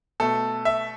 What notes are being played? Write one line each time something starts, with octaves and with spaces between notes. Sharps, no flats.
B2 A3 A4
E5